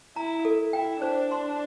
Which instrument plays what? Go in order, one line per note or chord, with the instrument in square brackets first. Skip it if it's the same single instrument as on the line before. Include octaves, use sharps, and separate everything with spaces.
[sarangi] E4 [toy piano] A#5
[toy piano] A4
[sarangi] E4 [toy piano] G5
[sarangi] D4 [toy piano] C5
[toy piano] C6